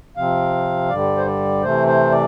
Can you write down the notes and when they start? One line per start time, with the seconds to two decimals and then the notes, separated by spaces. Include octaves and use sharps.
0.17 C3 F3 C4 F5
0.90 G2 D3 G3 D5
1.17 C5
1.26 D5
1.63 C3 E3 A3 C5
1.87 C5
2.11 D5